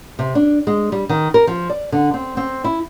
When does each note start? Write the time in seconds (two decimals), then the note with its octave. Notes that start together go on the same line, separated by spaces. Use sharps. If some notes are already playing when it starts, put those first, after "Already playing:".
0.19 C3
0.35 D4
0.67 G#3
0.92 G3
1.09 D#3
1.34 A#4
1.47 F3
1.70 D5
1.92 D3
2.14 C4
2.37 C4
2.64 E4